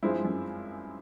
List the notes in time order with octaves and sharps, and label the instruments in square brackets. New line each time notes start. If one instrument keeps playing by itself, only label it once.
[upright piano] G2 [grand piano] F3 G#3 C4 E4
[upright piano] F#2